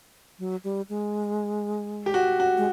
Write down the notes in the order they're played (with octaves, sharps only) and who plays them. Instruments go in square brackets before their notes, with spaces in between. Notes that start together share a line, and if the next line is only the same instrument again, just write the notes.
[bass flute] F#3
G3
G#3
[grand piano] G4
F#4
F#4
[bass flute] G#3